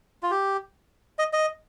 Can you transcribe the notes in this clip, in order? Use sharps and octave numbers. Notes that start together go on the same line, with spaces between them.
F4
G4
D#5
D#5